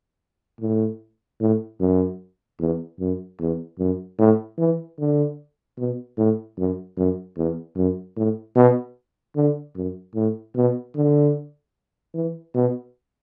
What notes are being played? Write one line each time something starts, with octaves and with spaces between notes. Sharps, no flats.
A2
A2
F#2
E2
F#2
E2
F#2
A2
E3
D3
B2
A2
F#2
F#2
E2
F#2
A2
B2
D3
F#2
A2
B2
D3
E3
B2